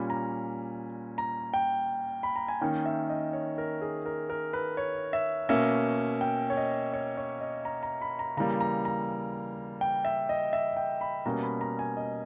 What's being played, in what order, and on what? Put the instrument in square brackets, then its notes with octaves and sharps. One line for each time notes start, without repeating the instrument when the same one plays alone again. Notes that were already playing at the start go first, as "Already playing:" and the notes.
Already playing: [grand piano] A#2 G3 C#4 B5
A#5
A#5
G5
B5
A#5
G#5
D#3 A#3 C#4 G5
E5
D#5
C#5
A#4
G#4
A#4
A#4
B4
C#5
E5
B2 A#3 C#4 E5
G5
C#5
D#5
C#5
C#5
D#5
A#5
A#5
B5
A#5
C#3 E3 G3 A#3 A#5
A#5
A#5
G5
E5
D#5
E5
G5
B5
B2 G3 A#3 C#4 A#5
B5
A#5
G#5
D#5